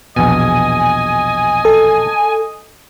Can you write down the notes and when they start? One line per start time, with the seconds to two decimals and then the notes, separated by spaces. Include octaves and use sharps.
0.16 A#1 E2 B2 D#5 G#5
1.65 A4